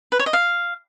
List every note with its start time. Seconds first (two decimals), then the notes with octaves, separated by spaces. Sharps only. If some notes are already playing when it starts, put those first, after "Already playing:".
0.12 B4
0.19 C#5
0.26 D#5
0.33 F5